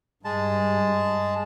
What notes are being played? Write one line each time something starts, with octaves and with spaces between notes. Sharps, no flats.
G2 G#3 A5